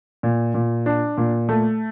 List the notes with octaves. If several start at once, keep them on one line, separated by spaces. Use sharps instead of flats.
A#2
A#2
D4
A#2
A3